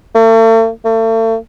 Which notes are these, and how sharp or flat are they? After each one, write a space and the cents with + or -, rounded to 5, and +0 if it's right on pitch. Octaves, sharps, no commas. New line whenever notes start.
A3 +40
A3 +40